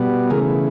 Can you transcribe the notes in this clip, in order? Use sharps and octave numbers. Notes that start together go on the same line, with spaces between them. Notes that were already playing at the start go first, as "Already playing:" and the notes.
Already playing: B2 G3 B3
C#3 E3 A3 G#4 A#4